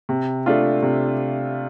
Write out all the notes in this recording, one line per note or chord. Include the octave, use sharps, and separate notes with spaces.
C3
A3 D4 F4
C3